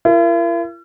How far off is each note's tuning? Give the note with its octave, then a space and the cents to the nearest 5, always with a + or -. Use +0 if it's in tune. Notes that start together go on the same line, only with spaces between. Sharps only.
E4 +45 A#4 +0